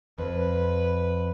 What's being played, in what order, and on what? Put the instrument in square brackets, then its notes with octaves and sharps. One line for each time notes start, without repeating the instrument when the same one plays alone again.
[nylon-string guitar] F2 [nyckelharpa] B4